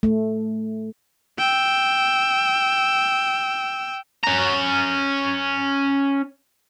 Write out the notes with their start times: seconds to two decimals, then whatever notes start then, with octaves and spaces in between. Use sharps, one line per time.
0.03 A3
1.38 G5 E6
4.24 C#4 A#5